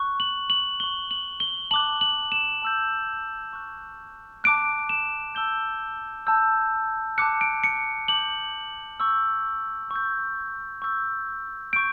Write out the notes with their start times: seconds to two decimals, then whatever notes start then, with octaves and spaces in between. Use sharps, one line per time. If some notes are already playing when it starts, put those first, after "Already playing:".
Already playing: C#6 F#6
0.20 F#7
0.50 F#7
0.80 C#6 F#6 G7
1.11 F#7
1.40 G7
1.71 A5 D6 F#6 F#7
2.01 F#7
2.32 E7
2.62 A5 E6 G6
3.53 C#6 F#6
4.44 A5 D6 F#6 D7
4.89 E7
5.35 A5 E6 G6 G7
6.27 A5 E6 G6
7.18 A5 D6 F#6 C#7
7.41 D7
7.64 C#7
8.08 A5 D6 G6 F#7
9.00 C#6 E6 G6
9.91 C#6 E6 G6
10.82 C#6 E6 G6
11.73 C#6 G6 D7